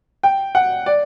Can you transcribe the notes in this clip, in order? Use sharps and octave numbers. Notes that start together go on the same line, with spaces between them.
G5
F#5
D5